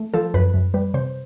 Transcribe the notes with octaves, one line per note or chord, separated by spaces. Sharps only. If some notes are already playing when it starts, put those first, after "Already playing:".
Already playing: A3
F3 A4
F#2 B4
F#2
G3 B4
C3 C5